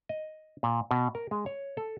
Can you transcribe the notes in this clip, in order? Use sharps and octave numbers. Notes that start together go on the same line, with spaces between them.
D#5
A#2
B2
A#4
G#3
C#5
A4